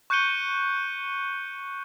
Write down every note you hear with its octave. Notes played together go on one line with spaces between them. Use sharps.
C#6 F#6 G6 C#7 D#7 G7